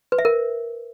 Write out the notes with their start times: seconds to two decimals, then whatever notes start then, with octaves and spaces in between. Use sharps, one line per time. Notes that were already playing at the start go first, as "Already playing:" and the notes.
0.12 B4
0.18 E5
0.25 A#4